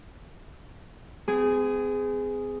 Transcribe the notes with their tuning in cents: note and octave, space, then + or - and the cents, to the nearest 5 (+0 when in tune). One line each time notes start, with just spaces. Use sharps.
C4 -40 G#4 +0